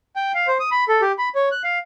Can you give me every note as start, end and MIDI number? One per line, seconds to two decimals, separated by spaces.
0.16 0.32 79
0.35 0.47 77
0.47 0.58 72
0.60 0.70 87
0.71 0.84 83
0.89 1.01 69
1.02 1.12 67
1.18 1.29 83
1.35 1.49 73
1.52 1.62 90
1.64 1.78 77